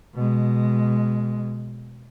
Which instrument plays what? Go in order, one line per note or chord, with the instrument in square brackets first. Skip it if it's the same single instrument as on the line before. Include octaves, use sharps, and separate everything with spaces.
[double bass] B2 G#3